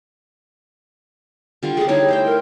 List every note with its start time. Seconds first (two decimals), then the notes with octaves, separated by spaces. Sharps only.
1.63 D3 G3 F4
1.77 G#3 G#4 D5
1.88 G3 D#4 E4 C#5
2.08 A3 C5 G5
2.26 A#4